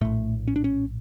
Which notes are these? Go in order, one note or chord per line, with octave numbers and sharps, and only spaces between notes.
A#1 A2 A3
C#4
D4
C#4